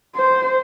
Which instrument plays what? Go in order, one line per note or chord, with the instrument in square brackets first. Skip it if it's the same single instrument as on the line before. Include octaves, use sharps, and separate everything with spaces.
[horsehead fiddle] C5